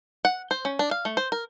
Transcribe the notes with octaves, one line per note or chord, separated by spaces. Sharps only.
F#5
C5
C#4
D4
F5
A3
C5
A#4